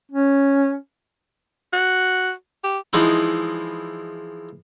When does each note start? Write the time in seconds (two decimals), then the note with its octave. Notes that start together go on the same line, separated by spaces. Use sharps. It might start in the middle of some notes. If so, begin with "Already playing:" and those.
0.12 C#4
1.73 F#4
2.64 G4
2.93 E3 F3 G#3 D#4 E4